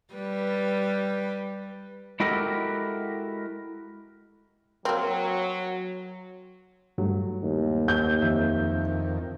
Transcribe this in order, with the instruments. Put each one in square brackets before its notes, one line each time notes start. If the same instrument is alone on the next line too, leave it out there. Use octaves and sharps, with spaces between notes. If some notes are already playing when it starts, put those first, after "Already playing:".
[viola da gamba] G3 B4
[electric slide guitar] G#3 E4 F#4 G4 A4 A#4
[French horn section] F#3 [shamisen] A#3 C4
[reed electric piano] G2 F#3 A3
[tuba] D#2
[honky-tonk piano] G6
[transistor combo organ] F2 D#3 [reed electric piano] E5